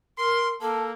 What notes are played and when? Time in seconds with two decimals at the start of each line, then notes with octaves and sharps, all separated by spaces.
0.18 A#4 C6
0.61 A#3 A4 A5